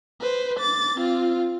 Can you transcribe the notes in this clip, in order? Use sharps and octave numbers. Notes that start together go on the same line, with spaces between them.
B4 C5
D6 A6
C4 F4